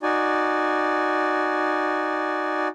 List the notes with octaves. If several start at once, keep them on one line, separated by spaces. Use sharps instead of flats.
D#4 F#4 D5 G#5